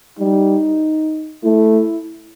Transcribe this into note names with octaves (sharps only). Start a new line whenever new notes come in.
G3 D#4
A3 E4